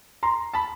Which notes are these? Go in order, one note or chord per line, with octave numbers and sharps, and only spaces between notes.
A#5 C6
A5 B5